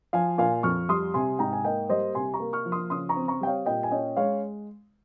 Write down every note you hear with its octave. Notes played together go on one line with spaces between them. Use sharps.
F3 F5 G#5
A#2 F5 G#5
F2 C#6 F6
G3 C6 D#6
C3 G#5 C6
G#2 G5 A#5
G#5
A#3 D#5 G5
G3 C5 D#5
C3 G#5 C6
A#5 C#6
A#3
C#6 F6
F3
C6 D#6
C#3 C6 D#6
A#5 C#6
C4
A#5 C#6
G3 G5
C#5 F5
A#2 D#5 G5
G#5
C#4 D#5 G5
G#3 C#5 F5